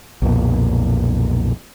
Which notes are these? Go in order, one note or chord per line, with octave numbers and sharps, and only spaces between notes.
B1 F2 A#2